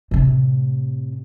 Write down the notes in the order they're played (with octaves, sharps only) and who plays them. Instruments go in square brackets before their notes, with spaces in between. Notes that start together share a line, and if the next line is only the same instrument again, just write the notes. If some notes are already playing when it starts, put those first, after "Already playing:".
[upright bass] A2 C3